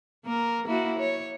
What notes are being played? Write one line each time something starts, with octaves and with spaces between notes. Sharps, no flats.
A#3 A#4
A#3 E4 F#4
C#5